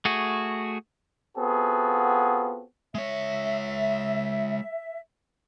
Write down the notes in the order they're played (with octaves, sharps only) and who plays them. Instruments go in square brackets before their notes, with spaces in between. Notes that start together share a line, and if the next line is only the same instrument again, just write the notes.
[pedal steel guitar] A3 F#4 G#4
[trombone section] B3 C4 F4 F#4 G#4 A4
[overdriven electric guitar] G#3 C#5 [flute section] E5